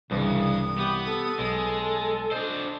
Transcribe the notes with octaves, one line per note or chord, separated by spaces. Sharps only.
C2 G2 C#3 E3 D#6
B3 G4
A4
B1 G#3
D4 C5 D#5